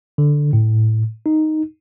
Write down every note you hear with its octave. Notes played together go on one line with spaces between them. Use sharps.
D3
A2
D#4